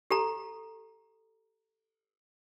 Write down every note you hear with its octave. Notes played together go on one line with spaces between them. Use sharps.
G4 A4 A#5